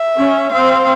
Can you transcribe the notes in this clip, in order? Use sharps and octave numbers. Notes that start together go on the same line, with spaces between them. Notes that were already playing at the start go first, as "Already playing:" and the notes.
Already playing: E5
C#4
C4 F5